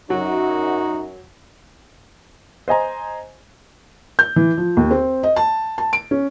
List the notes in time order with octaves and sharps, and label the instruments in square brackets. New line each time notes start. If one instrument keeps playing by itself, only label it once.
[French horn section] F#2 [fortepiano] F#3 [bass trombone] D#4 [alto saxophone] F#4
[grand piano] C5 D#5 G#5 A#5
[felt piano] G6
E3
F3
D#2
C4
D#5
A5
A5
D7
C#4